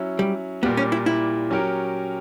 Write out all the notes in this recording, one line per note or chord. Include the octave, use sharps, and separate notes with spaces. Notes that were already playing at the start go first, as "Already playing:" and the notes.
Already playing: F#3 C#4 E4
G3
A#2 G3 A#3 B3
C#4
E4
E4
F#3 C#4 G4 A#4